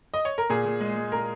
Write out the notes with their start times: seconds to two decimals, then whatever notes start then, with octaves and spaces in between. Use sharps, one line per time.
0.14 D#5
0.25 C#5
0.38 A#4
0.50 A#2 G#4
0.65 A#2
0.81 G#3
0.97 G#3
1.12 A#2 A#4